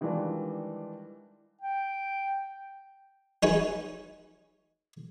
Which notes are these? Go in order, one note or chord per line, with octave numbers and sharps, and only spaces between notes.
D#3 E3 G3 G#3 D4 F4
G5
F#3 D#4 G#4 B4 C#5